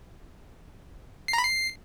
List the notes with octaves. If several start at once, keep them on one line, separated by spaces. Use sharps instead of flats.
C7
A#5
B5
C7